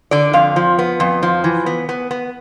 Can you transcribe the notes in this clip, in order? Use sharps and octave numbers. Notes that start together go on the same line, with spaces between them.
D3 D5
F2 F5
F3
B3
F2
F3
E3
B3
B3
B3